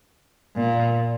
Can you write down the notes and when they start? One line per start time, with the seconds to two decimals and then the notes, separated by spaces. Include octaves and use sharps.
0.56 A#2